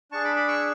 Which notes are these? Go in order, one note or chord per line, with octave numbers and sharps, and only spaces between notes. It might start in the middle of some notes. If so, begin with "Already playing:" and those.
D4 G#4 A5 C#6
B5 D6
B5 D6
C#6 E6